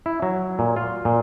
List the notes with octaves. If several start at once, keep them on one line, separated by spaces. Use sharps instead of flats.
E4
F#3
A#2
F4
A#2